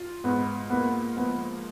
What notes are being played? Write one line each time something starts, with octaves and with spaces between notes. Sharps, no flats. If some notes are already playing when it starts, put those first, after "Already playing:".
Already playing: F4
G#2 B3
A#3 B3
F3 B3